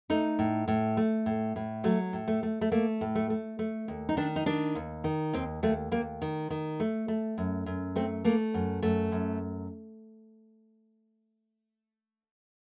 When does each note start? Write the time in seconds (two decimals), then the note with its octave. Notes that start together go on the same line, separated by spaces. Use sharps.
0.10 A3 D#4
0.39 A2
0.68 A2
0.97 A3
1.26 A2
1.56 A2
1.84 F#3 A3
2.13 A2
2.27 A3
2.43 A3
2.61 A3
2.72 A3 A#3
3.01 A2
3.15 A3
3.30 A3
3.59 A3
3.88 D#2
4.09 D#4
4.17 D#3 D4
4.36 D#4
4.46 D#3 D4
4.75 D#2
5.04 D#3
5.33 D#2 C4
5.63 D#2 A3
5.91 D#2 A#3
6.22 D#3
6.50 D#3
6.80 A3
7.08 A3
7.38 F#2
7.66 F#2
7.96 A3 C4
8.24 A3 A#3
8.54 F#2
8.82 F#2 A3
9.12 F#2